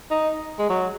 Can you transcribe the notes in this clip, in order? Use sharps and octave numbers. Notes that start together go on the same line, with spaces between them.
D#4
G#3
F#3